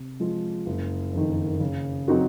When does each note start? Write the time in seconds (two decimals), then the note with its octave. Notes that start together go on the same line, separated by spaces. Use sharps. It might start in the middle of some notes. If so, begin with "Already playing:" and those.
Already playing: C3
0.20 F3 G#3
0.66 F#1
1.13 F2 D#3
1.60 C#3
2.08 F#3 C4 D#4 F#4